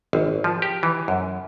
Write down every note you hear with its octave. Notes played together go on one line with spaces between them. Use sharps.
G#1
F3
G4
E3
F#2